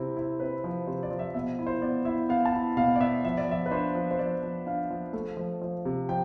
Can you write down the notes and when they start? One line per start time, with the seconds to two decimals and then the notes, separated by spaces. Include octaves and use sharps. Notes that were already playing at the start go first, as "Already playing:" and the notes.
Already playing: C3 C4 E4
0.17 E4
0.40 C4 B4
0.64 F3
0.87 C3 C5
1.03 D5
1.11 F3
1.19 E5
1.34 B2 E5
1.59 E4
1.67 C5
1.82 B3 D5
2.05 E4 E5
2.29 B3 F5
2.45 A5
2.53 E4
2.77 B2 F5
2.96 D5
3.01 B3 E5
3.24 F3 E5
3.37 D5
3.48 F3 E5
3.66 B4
3.71 D4 C5
3.95 F3
4.11 C5
4.18 F3 D5
4.43 F3
4.66 D4 F5
4.90 F3
5.13 A3
5.37 F3
5.61 F3
5.85 C3
6.09 F3 G5